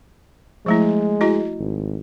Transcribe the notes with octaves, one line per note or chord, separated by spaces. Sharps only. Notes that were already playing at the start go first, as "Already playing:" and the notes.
F3 G#3 A3 E4
E4 F#4 D#5
G#1